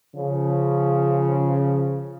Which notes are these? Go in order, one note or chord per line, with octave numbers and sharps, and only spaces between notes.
C#3 F3